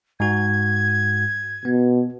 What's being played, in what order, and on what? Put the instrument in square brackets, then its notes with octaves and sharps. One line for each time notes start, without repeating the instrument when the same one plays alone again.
[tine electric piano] G#2 F#4 [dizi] G#6
[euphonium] B2 [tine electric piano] B3